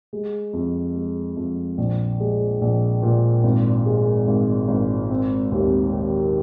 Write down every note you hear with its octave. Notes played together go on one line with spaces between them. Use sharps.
G#3
F2
G#3
F2
A#1
G#3
A#1
A#2
G#1
G#3
G#1
G#1
C4
D#2
D#3